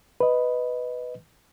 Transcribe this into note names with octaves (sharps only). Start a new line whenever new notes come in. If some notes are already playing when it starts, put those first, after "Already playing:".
B4 D#5